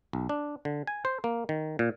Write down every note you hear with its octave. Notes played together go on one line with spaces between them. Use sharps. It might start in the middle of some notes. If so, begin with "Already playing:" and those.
B1
D4
D3
G#5
C5
A#3
D#3
A#2